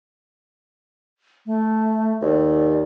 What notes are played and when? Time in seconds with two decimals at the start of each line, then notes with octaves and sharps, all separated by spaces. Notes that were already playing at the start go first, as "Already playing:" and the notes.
1.46 A3
2.22 D#2 D5